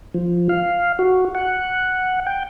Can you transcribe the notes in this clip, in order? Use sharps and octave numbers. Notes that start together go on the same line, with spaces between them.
F3
F5
F#4
F#5
G5